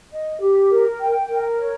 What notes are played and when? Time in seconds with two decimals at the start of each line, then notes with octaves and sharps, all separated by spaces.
0.11 D#5
0.41 G4
0.70 A#4
0.99 G5
1.29 A#4
1.58 C#5